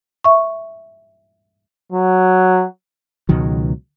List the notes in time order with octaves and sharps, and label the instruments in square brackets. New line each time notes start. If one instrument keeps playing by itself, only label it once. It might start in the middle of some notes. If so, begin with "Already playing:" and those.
[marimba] E5 C#6
[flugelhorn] F#3
[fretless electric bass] C#2 B2 D#3 F#3